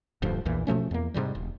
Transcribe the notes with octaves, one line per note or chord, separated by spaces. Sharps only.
D1 D2 G2 F3
A#1 E2 A#2 E3
B2 F3 A3 C#4
E2 A#3
G#2 C3 D#3 G3
D#1